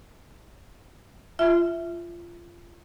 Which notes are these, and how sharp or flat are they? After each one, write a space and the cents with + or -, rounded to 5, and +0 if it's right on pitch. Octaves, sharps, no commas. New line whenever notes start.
F4 -20 E5 +0